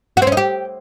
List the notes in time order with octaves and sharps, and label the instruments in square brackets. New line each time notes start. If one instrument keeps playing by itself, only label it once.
[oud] F#4
C4
C#4
D#4
G4